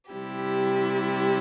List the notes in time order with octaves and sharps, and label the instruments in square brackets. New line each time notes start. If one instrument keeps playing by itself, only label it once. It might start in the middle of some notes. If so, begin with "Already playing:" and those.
[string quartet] C3 G3 E4 G4